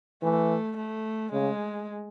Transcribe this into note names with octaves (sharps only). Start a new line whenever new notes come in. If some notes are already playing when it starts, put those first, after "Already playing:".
E3 A3
A3
C#3 G#3